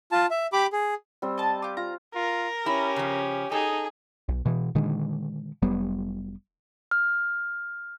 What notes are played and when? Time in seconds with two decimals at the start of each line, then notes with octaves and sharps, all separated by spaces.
0.12 F4 A5
0.30 E5
0.53 G4 B5 D6
0.73 G#4
1.22 G3 C4
1.38 D#5 A5
1.62 F4 G4
1.77 F4 A#5
2.15 F4 A#4
2.66 C#4 E4 G4
2.96 C#3 F3
3.52 D#4 G#4 A4
4.29 B1
4.45 B2 E3
4.75 A#2 D3 D#3 G#3
5.62 F1 F#3 G3 B3
6.91 F6